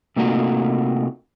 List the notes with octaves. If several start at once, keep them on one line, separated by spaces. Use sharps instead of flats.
C3 A3 A#3 D#4 F4 F#4